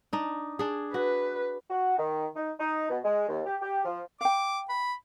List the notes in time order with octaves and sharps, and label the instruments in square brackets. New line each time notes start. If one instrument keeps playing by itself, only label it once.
[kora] D4 D#4
D4 G#4
[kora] F#4 [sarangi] B4
[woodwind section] F#4
D#3
D#4
D#4
B2
G#3
D#2
G4
G4
F3
[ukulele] F5 G5 [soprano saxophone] D6
[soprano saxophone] B5